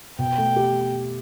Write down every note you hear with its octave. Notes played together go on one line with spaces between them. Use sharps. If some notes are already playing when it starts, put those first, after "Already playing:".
B2 G5
A3
G4